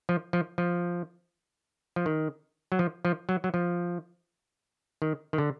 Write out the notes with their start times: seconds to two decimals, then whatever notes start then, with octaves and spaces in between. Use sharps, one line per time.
0.09 F3
0.33 F3
0.58 F3
1.96 F3
2.06 D#3
2.72 F#3
2.79 F3
3.05 F3
3.29 F#3
3.44 F#3
3.54 F3
5.02 D#3
5.33 D#3
5.38 D3